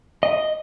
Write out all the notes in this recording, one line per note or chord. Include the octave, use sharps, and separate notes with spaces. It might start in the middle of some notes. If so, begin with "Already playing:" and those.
D#5